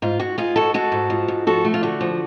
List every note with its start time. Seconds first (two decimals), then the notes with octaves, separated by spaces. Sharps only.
0.02 G#2 F4
0.19 G#2 F#4
0.38 G#2 F4 G#4
0.56 G#3 F#4 A4
0.74 G#3 F#4 A4
0.92 G#2
1.10 F3
1.28 G#2
1.47 F3 F#4 A4
1.65 A3
1.74 F4
1.83 D3 F#4
2.01 F3